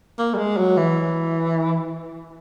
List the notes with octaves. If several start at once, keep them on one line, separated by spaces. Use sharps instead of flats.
A#3
G3
G#3
F#3
E3